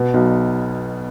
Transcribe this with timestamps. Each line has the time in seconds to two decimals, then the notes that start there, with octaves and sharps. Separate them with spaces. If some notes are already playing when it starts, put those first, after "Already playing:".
Already playing: B2 B3
0.14 B1